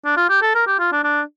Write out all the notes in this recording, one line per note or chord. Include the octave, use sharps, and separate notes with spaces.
D4
F4
G4
A4
A#4
G4
F4
D4
D4